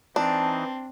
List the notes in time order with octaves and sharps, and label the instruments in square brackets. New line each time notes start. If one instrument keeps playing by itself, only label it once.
[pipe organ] E3 D#4 [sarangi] C4 [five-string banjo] D4 [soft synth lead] A5